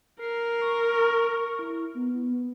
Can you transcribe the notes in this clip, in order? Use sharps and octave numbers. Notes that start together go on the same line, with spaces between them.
A#4 C7
C#6
E4
B3